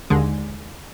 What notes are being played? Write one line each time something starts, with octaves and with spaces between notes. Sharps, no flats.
D#2 D3 G#3